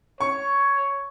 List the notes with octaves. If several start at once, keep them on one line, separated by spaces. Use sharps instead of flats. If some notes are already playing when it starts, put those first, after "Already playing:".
C#5 C#6